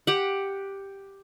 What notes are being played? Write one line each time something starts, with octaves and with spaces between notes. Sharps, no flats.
G4 F#5